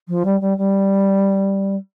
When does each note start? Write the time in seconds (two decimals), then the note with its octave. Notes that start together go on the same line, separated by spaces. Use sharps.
0.08 F3
0.25 G3
0.40 G3
0.57 G3